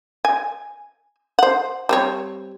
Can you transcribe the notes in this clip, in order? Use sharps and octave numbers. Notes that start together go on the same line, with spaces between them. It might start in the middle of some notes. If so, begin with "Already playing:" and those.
G#5
C5 F#5
G3 C4 C#5